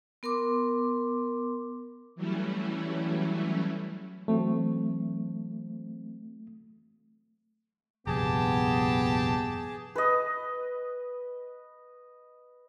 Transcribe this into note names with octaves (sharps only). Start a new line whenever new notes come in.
B3 A#4 C6 D6
E3 F#3 G3 A3 C#4 E4
E3 F#3 A3 C4
F1 A#1 G2 B3 G4 G#4 A5
B4 D#5